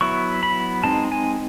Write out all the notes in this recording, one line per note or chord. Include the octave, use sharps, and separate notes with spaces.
F#3 B3 E4 C#6
B5
G#3 C4 D#4 A5
G#5